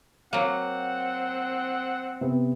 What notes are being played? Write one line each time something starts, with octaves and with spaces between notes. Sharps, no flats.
F#3 A#3 C4 F#5
C3 B3